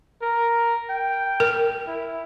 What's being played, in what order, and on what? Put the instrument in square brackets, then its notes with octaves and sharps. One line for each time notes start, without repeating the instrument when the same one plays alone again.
[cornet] A#4
G5
[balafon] A#4
[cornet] E4